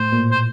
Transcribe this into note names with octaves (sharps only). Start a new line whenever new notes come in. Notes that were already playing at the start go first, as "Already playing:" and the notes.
Already playing: A2 C5
A#2
C5